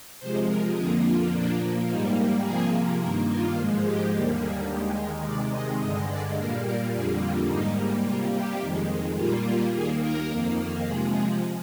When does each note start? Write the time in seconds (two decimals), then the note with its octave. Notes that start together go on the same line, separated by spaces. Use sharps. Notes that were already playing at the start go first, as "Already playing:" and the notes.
0.19 C3 F3 G#3 C5
0.48 A#4
0.75 F2 D3 F3 A#3 G#4
1.04 F4
1.32 A#2 F3 A#3 D4
1.87 G#2 G3 A#3 D#4
2.16 G4
2.43 C3 F3 A#3 G#4
3.00 G2 D#3 A#3 A#4
3.28 F4
3.57 G#2 F3 G#3
3.84 G4
4.12 D#2 D3 G3 A#3
4.40 G#4
4.67 D#2 D#3 G#3 G4
4.96 A#4
5.24 C3 D#3 G#3 D5
5.52 D#5
5.80 G2 D3 G#3 D#5
6.09 D5
6.36 A#2 G3 A#3 A#4
6.64 A#4
6.92 F2 D3 G3 A#3 G#4
7.20 F4
7.48 G#2 G3 A#3 D#4
8.04 C3 G3 A#3 F4
8.33 G4
8.60 F2 D#3 G#3
9.16 A#2 G3 A#3 F4
9.44 F4
9.73 D#2 D#3 A#3 G#4
10.00 A#4
10.28 F2 D#3 A#3
10.84 C3 F3 G#3 G#4
11.13 G#4